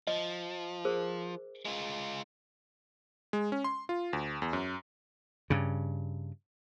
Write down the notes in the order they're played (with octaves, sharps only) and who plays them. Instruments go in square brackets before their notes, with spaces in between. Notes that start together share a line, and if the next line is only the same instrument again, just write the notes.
[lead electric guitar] F3 [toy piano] D#5
[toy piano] G#4 A#4 C5
[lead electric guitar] G#3 F4
[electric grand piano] G#3
C#4
C6
F4
D2
E2
F#2
[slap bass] G2 C#3